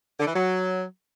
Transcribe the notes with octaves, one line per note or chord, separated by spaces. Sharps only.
D3
E3
F#3